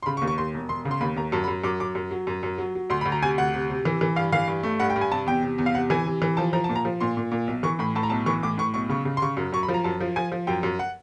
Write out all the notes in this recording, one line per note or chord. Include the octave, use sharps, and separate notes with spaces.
C6
C#3 B5
C#6
D#2
C#6
D#2 C6
E1
E1 C6
C#3
C6
D#2 B5
D#2 A#5
F#2 A5
B5
F#2
F#2 D6
F#2 D6
F#2
F#3
F#2
F#2
F#3
F#3
D2 C6
B5
D2
A#5
C3 G#5
D2 F#5
C3
C3
E3
E3
G2 F5
E3 F5
G2
A3
G2 F#5
G5
G2
G#5
C3 A5
E2 G5
C3
E2
F5
C3 F#5
E3 G#5
C3
E3
F3 A5
F3 A#5
A5
A#2
A#5
F3
A#2 C6
A#2
A#2
B1
E3 C#6
A2 B5
A2 A5
A#5
B1 A5
E3 C#6
A2 D6
A2 C#6
B1 C#6
C#3 C#6
C#3
C6
C#3 C#6
F#2
F#2 C#6
B5
F3
A#5
F#2 A5
F3
F3 G#5
F3
F#2 G5
F#2
F#5